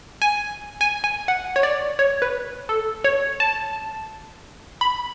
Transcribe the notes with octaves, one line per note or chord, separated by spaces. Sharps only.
G#5
G#5
G#5
F#5
C#5
D5
C#5
B4
A4
C#5
A5
B5